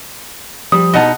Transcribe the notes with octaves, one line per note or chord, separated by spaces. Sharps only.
F3 G3 D#6
B2 D#4 D#5 F#5 A5